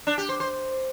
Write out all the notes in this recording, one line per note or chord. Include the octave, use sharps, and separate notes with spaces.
D4
G4
C5
C5